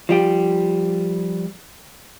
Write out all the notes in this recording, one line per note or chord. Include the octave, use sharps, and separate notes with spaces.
F3 G3 G4